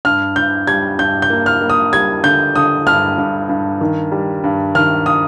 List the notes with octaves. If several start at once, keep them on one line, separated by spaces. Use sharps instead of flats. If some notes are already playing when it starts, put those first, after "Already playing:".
G2 F6
G2 G6
G3 G#6
G2 G6
G6
A#3
F6
A#3
D#6
G3 G#6
D3 G6
D3 D#6
G2 F6
G2
G2
D#3
G3
G2
D#3 F6
D#6